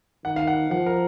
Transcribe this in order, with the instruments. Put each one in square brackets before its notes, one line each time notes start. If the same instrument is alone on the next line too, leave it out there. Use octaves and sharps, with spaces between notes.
[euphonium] D#3 [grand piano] F#5
[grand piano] F5
F#5
[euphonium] F3 [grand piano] F#5
[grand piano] A#4